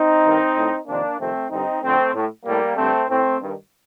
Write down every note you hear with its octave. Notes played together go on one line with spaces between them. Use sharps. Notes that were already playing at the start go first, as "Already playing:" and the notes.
Already playing: C4 D#4
G2 D#3
A2
F2 C3 D#3 A#3 D4
F2 C3 D#3 A3 C4
G2 D3 C4 D#4
F2 D3 A3 C4
A2
A2 G3 A#3
G2 D3 A3 C4
A2 A3 C4
G2 D#3